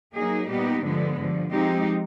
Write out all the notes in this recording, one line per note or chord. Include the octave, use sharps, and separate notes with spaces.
F#3 A#3 D#4 G#4
A#2 G3 B3 D#4 G4
G2 D3 F3 G#3 B3
G2 D3 F3
F3 G#3 C4 D#4 G4